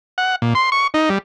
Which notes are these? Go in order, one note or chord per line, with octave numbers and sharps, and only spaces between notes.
F#5
A#2
C6
C#6
D#4
G3